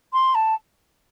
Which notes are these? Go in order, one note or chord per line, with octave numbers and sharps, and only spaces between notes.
C6
A5